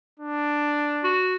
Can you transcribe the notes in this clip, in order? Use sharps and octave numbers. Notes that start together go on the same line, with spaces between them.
D4
F#4